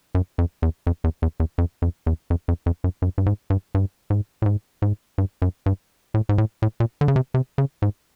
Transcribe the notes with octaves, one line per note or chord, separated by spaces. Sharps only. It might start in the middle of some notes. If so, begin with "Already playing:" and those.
F#2
F2
E2
F2
E2
E2
E2
F2
F2
E2
F2
F2
F2
F#2
F#2
G2
G#2
G2
G2
G#2
A2
G#2
G#2
G2
F#2
G2
A2
G#2
A2
A2
A#2
D3
C#3
C3
C3
C#3
G#2